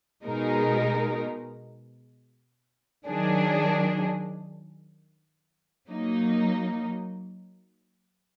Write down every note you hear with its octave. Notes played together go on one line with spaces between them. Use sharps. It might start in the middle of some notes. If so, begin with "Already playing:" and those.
B2 G#3 D#4 A#4
D#3 F#3 D4 G#4
F#3 A#3 D#4